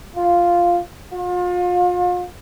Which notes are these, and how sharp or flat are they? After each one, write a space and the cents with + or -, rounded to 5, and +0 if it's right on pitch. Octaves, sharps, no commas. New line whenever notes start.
F4 +0
F4 +35